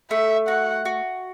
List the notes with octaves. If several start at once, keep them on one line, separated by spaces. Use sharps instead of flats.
A3 E5
F#4 F#5
F#4